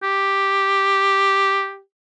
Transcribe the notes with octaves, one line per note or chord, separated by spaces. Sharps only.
G4